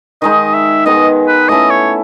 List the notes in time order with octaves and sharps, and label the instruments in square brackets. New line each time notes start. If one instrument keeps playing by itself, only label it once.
[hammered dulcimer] D#3 G#3 D#4 [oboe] D#5
[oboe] E5
[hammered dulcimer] D#3 G#3 B3 D#4 [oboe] D#5
[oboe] B4
[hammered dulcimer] A3 C#4 E4 A4 [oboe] D#5
[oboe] C#5